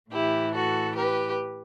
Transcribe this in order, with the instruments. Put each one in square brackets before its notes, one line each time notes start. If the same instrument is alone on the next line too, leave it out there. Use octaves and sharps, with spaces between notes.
[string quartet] A2 E3 E4 G4
F#4 A4
G4 B4